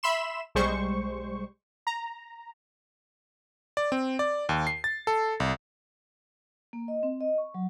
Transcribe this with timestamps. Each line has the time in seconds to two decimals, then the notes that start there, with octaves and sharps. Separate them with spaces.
0.03 E5 B5 C6 E7
0.55 B1 G3 G#3 C5 C#6
1.87 A#5
3.77 D5
3.92 C4
4.19 D5
4.49 D#2
4.67 C7
4.84 A6
5.07 A4
5.40 C2
6.73 A#3
6.88 D#5
7.03 C4
7.21 D#5
7.38 C#6
7.54 F#3